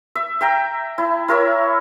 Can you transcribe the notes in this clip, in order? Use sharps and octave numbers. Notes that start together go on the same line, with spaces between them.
E5
E5 G5 A#5
E4
E4 A#4 C#5 E5